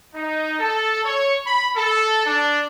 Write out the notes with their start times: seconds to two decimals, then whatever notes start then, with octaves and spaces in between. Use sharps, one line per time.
0.15 D#4
0.59 A4
1.04 C#5
1.46 B5
1.76 A4
2.26 D4